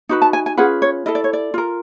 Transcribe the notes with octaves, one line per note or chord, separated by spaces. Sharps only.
D#4 F#4 B4
A5
G#5
G#5
C#4 F4 G#4 B4 F#5
C#5
E4 A4 D#5
D5
C#5
D5
F4 A#4